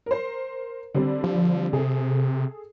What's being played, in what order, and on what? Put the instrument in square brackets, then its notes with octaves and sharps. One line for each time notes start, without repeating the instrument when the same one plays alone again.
[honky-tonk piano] A#4 C5
D3 G3 C4
[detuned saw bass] F3
[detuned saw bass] C3 [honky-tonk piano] G#4 A4